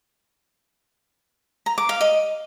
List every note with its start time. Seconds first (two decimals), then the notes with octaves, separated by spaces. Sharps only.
1.66 A#5
1.78 D6
1.89 F5
2.01 D#5